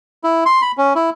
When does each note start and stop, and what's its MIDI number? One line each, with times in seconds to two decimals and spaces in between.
0.24 0.44 64
0.46 0.62 84
0.62 0.72 83
0.77 0.93 61
0.95 1.10 64